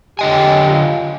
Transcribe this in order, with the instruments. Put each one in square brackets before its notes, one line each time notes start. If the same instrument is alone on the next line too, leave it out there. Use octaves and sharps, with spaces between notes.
[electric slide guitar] D3 D#5 G#5 [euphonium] G4
[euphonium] F4